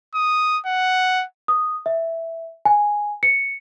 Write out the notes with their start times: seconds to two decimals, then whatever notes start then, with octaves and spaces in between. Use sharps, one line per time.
0.15 D#6
0.66 F#5
1.48 D#6
1.86 E5
2.65 G#5
3.23 C#7